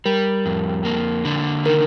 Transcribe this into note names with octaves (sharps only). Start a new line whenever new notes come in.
G3 A#4
F2
A#3
D3
D#3 A#4